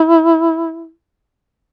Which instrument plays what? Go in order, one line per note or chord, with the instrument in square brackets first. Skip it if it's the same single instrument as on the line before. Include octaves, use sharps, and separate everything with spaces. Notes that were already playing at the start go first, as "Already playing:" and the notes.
Already playing: [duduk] E4